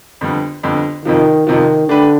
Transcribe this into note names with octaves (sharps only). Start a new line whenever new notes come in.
F2 D3 G3 B3
F2 D3 G3 B3
F2 C3 D#3 F3
F2 C3 D#3 F3
D3 A3 D4 G4 B4